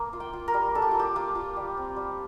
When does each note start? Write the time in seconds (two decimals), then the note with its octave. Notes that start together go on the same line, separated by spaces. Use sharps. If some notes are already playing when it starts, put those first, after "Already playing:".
Already playing: A#3
0.13 F4
0.20 G5
0.33 F4
0.48 A#4
0.54 G3
0.75 D4 A4
0.82 G4
0.91 A#3 F4
0.99 G4
1.15 A#3 F4
1.35 F4
1.56 G3
1.77 C4
1.96 G3